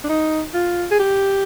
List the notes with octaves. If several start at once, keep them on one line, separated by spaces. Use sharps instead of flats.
D4
D#4
F4
G#4
G4